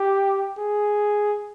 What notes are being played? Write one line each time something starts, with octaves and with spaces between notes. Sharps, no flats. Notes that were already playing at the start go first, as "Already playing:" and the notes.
Already playing: G4
G#4